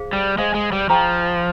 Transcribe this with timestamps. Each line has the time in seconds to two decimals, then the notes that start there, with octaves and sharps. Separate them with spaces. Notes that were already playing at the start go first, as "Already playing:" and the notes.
Already playing: G#4 C5 F5
0.13 G3
0.38 G#3 G#4 C5 F5
0.55 G#3
0.72 G3
0.89 F3 G#4 C5 G5 A#5 C#6